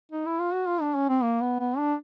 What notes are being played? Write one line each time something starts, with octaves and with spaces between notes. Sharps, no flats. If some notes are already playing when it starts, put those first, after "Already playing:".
D#4
E4
F4
F#4
F4
D4
C#4
C4
A#3
B3
B3
D4